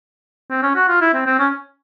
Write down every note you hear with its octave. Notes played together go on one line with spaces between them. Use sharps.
C4
C#4
F#4
F4
E4
C4
C4
C#4